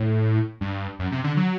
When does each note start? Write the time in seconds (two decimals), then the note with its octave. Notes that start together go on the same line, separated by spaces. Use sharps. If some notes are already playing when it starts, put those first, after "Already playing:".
Already playing: A2
0.61 G2
0.99 F#2
1.12 C3
1.24 D3
1.37 F#3